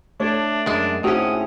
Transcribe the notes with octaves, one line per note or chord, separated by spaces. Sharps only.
A3 D4 A4 C#5
F#2 G#3 D4
A2 C4 C#4 D#4 F#4 G#4 D#6